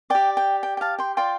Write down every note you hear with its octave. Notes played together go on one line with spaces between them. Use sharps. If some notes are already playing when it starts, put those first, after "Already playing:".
G4 D5 G5
G5
G5
G5
F5 A5
G5 C6
F4 D5 G5 C6